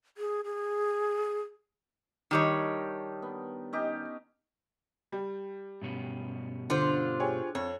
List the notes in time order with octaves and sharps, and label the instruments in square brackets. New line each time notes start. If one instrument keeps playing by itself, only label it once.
[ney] G#4
G#4
[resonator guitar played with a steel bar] D#3 G3 C#5 [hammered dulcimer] D4 D#4
[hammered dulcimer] B3
C#4 D#4 G4
[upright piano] G3
[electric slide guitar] G2 B2 C#4
[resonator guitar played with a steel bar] D3 [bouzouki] F4 C5
[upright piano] G4 G#4 C#5
[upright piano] F2 [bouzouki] C#5